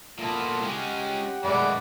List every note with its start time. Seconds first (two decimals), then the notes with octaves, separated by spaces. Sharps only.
0.19 A#2 B3 E4 F4 A4
0.62 G#3 C#4 G4 F#5 G5
1.44 F#2 B2 G#3 A3 D5 F#5 G#5 B5